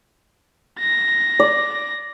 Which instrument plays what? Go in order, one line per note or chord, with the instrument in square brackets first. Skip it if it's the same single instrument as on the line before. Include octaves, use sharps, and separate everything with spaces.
[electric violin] A#6
[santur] D5